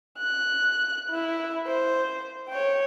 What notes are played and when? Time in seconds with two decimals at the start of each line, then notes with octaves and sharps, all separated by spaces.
0.19 F#6
1.10 E4
1.67 C5
2.49 C#5 G5